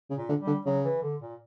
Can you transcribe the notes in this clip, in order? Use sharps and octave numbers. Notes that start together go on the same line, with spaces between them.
C#3
A#2
D3
G3
D3
C#3 F#3
E3
D3
A#2